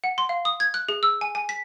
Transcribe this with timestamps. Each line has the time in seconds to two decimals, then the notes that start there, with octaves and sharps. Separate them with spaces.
0.04 F#5
0.18 C6
0.29 F5
0.45 D#6
0.60 G#6
0.74 F#6
0.89 G#4
1.03 E6
1.21 G#5
1.35 G#5
1.49 B6